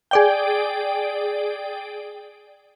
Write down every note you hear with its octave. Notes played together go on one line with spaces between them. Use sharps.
G#4 D5 G5